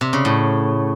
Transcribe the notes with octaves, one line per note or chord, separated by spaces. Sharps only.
C3
C#3
A2